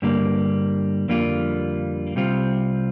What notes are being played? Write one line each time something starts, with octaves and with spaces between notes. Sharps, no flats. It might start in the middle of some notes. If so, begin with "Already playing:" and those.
G2 D3 G3 A#3
F2 D3 G3 A#3 F4
C2 C3 G3 C4 F4